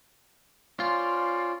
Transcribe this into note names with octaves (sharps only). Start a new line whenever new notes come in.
C#4 F4 C5 D5